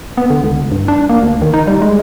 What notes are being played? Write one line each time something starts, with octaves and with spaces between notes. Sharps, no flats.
B3
D3
C#2
G2
D4
A#3
D2
D#3
D#4
G3
G#3